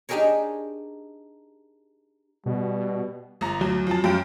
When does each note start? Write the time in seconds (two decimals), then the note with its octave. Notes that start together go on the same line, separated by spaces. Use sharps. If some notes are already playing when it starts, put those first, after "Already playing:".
0.09 D4 D#4 G4 G#4 A#4 C#5
2.46 B2 G3
3.41 G1 A#5
3.61 D2 F#3
3.87 F2 A5
4.04 F#2 F5 G5